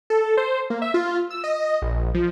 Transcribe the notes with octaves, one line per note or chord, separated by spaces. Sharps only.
A4
C5
A#3
E5
F4
E6
D#5
A#1
F3